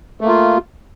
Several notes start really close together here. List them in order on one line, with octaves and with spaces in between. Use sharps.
A3 A#3 F4